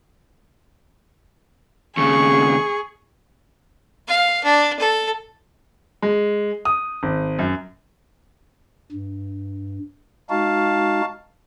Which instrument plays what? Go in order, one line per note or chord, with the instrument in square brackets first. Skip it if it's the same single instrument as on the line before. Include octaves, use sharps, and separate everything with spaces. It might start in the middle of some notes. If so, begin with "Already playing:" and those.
[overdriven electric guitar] D#2 C#3 [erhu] G#4 [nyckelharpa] C#6
[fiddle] F5
D4
A4
[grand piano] G#3
D#6
G#1
F#2
[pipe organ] G2
[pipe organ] G#3 D#4 F#4 [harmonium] F5 A5